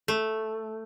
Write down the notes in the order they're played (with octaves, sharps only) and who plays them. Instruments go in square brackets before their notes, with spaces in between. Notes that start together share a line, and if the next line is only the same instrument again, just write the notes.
[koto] A3